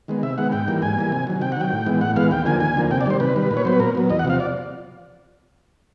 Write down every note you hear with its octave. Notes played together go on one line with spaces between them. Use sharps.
D#3 G#3 B3
C3 E5
D#3 G#3 B3 F#5
G#2 G5
E3 G3 A#3
G#2 G#5
E3 G3 A#3
C3
D#3 F#3
C3 G5
F#5
D#3 F#3 G5
A2
E3 G#3 B3
A2 F#5
E3 G#3 B3 F5
D#2 G5
D3 F3 A#3 G#5
D#2 G#5
D3 F3 A#3
C3 G5
D5
D#3 G3 C5
C3 B4
D#3 G3
A#2
C#5
F#3 B3 C5
B4
A#2 A#4
F#3 B3
E2 D#5
F#5
C3 F3 F5
D5